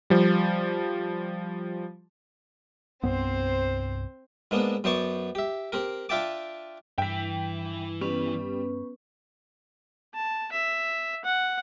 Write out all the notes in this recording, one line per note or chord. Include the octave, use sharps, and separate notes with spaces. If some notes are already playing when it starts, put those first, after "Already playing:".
F3 G3
C2 G2 B3 C4 C5
G#2 A#3 B3 D4
F#2 B3 C5 D5 A5 C#6
G4 E5
C4 G4 A#4
D4 F4 E5 G5 A5 D6
G2 E3 E5 G5 B6
G3 B3 C#4 B4
A5
E5
F#5